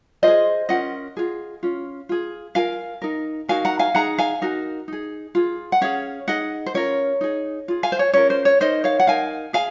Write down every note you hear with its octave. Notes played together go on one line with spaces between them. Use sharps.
F4 G#4 C5 D#5
C#4 F4 A#4 D#5 F#5
F4 G#4
C#4 F4
F4 G#4
F4 A#4 F5 G#5
D#4 A#4
D#4 F#4 A#4 F5 G#5
F#5 A#5
F5 G#5
D#4 G#4 F#5 A#5
F5 G#5
D#4 F#4 A#4
D#4 G#4
F4 G#4
F#5
C#4 G#4 C#5 F5
D#4 G#4 D#5 F#5
C5
C#4 F4 A#4 C#5
D#4 G#4
F4 G#4
F5 G#5
C5
C#5
C#4 F4 A#4 C#5
C5
C#5
D#4 A#4 C5 D#5
C#5 F5
F#5
D#4 A#4 F5 G#5
G#4 F5 G#5